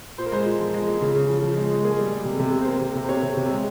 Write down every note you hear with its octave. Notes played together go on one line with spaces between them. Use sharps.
A#2 C5
A#4
G#3 C5
A#2
F3
G#3
A#2
C#3
C#3
F3
F3
G#3
G#3
A#3 G#4
G3
G3
C3
C3
C3
C5
A#3 A#4
C3
C3
C5
C3 C#5
C3
C3
G#3